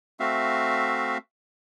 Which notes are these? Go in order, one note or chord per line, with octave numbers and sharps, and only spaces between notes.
A3 C4 F#4 E5 F5